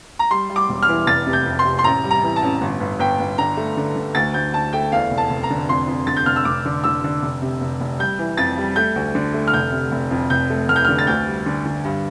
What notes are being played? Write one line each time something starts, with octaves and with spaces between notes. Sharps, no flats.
A#5
G3 C6
G3
D6
E1
F6
E3
F1 A6
C3
G6
F2
C6
C3
C6
A1 A#5
G3
A#5
E3
A5
A1
G1
G1
G1 G5
G1
D3 A#5
A3
D3
D3
D2 A6
D2 G6
D2 A5
A3 G5
E2 F5
F1
A5
F1
A#5
D3
F2 C6
F2
D3 A6
G6
F1 F6
E6
F1 D6
D3
D3 E6
D3
F1
C3
F1
F1
G3 G6
E3
F2 A6
G3
A3 G6
D2
D3
A3
F6
F1 G6
C3
F1
F2
F1 G6
A3
F1 F6
G6
D3 F6
A6
D2 G6
G3
D3
D3
G2